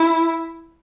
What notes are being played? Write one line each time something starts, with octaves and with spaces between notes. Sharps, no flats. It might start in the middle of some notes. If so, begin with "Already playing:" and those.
Already playing: E4